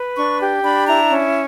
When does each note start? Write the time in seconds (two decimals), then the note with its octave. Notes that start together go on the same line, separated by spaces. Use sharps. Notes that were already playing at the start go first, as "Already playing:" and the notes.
Already playing: B4
0.16 D4 C#6
0.40 G4
0.64 D4 B5
0.87 E4 A#5
1.10 C#4